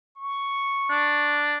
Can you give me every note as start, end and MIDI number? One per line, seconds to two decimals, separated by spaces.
0.17 1.40 85
0.90 1.58 62